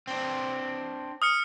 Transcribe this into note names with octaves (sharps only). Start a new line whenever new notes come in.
C4 D4
D#6 F6 C#7